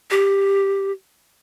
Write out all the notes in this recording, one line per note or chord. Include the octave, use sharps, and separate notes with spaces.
G4